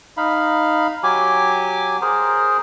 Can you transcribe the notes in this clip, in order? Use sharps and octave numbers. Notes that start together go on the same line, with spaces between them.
D#4 F5 B5
F#3 G4 G#5 D6
G#4 A#4 C5